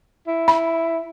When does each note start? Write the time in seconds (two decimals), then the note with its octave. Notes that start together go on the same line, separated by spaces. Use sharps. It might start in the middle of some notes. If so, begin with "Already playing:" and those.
0.27 E4
0.48 B5